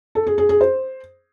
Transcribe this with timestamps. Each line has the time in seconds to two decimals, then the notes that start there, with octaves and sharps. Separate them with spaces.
0.15 A4
0.27 G#4
0.38 G#4
0.49 G#4
0.61 C5